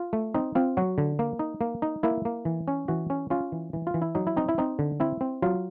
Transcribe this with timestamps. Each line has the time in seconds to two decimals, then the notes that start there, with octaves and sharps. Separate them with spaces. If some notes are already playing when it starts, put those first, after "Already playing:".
Already playing: F4
0.13 A3
0.34 C4 D#4
0.55 C4 F4
0.77 F#3 F#4
0.98 D3
1.19 A#3
1.39 D#4
1.61 A#3
1.82 D#4
2.03 A#3 E4
2.25 A#3
2.45 E3
2.68 C#4
2.88 E3 F#4
3.10 C#4
3.30 C#4 F4
3.52 E3
3.73 E3
3.87 F4
3.94 E3
4.02 E4
4.15 F#3 D#4
4.27 E4
4.37 C4 D#4
4.49 E4
4.58 C4 D#4
4.79 D3
5.00 C4 E4
5.21 C4
5.42 F#3 F4